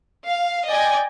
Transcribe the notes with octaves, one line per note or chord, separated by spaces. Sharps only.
F5
D5 D#5 G5 G#5